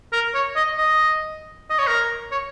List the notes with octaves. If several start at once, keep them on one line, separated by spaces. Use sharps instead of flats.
A#4
C#5
D#5
D#5
D#5
C#5
A#4
C#5